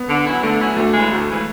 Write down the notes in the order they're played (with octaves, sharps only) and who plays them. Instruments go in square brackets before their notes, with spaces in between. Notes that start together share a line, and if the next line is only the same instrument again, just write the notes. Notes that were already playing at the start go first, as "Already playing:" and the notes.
Already playing: [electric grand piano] B3
[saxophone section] D3
F#3 C#4 E4
[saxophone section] D3 [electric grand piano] A3
[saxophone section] F#3 C#4 E4
[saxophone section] D2 [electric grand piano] A3
[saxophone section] C#3 E3 G#3
D2
C#3 E3 G#3